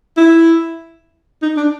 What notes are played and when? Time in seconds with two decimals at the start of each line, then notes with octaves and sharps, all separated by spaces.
0.17 E4
1.42 D#4
1.57 D4